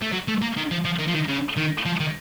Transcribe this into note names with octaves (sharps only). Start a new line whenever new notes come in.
A3
F#3
A3
A#3
D#3
F3
F3
D#3
F3
D#3
C#3
D#3
F3
D#3